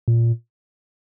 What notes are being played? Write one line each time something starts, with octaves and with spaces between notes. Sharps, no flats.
A#2